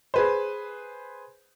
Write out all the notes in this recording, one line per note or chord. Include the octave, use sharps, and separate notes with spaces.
G#4 B4 C5